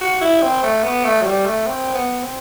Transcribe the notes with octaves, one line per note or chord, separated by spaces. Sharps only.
F#4
E4
C4
A3
B3
A3
F#3
G3
A3
C4
B3
C4